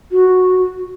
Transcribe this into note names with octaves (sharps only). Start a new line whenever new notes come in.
F#4